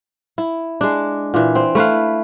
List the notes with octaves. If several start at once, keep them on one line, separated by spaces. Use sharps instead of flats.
E4
G#3 D4
A#2 E3
C4
A3 E4 B4 F5